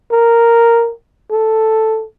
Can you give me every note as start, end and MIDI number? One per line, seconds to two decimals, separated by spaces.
0.11 0.91 70
1.31 2.04 69